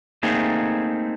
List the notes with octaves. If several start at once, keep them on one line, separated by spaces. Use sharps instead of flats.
A3 A#3 C4 D#4 G#4